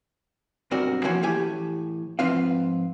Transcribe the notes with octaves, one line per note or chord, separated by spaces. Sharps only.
B1 G2 C4 F#4 A#4 D5
E3 F3 A#3 C#4 F#4 G#5
A2 E3 G4 G#5
G#2 F3 C4 F4 B4 F5